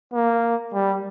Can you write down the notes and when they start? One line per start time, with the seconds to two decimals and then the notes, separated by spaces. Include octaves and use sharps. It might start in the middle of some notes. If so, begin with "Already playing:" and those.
0.14 A#3
0.73 G3